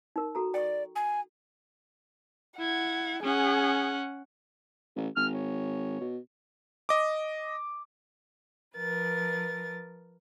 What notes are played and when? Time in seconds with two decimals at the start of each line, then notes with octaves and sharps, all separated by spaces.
0.16 D#4 A#4
0.35 F#4 A4 A#5
0.54 D5 G5 C#6
0.96 G#5
2.59 E4 F#5 G#6
3.23 C#4 G#4 F#5
4.96 A1
5.16 G#1 F6
5.33 C#5
6.01 B2
6.89 D#5 D6
8.76 F3 A#4 B4 A6